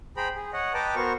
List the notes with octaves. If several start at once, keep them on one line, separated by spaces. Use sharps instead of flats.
G#4 C5 G5 A#5 B5
G#4
C#5 D#5 F#5
B4 D#5 G5 A5 A#5 D6
B3 F#4 A#4 C5 C#6